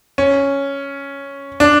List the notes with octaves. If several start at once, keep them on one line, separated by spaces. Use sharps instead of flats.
C#4
D4